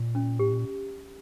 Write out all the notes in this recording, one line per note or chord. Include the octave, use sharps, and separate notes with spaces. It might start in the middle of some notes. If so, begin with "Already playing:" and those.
Already playing: A#2
C#4
A2 G4
A#2